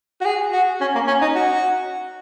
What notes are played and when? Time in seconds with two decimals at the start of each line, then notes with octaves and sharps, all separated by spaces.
0.21 F#4
0.25 G#4
0.53 F#4
0.80 C#4
0.95 A#3
1.07 C#4
1.21 D#4
1.35 F#4